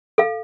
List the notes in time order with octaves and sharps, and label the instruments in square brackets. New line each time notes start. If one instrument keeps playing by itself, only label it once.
[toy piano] A4 F5